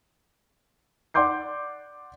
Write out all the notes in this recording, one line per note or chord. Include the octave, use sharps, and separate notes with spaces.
D5 F#5 C6 D6 G6 C7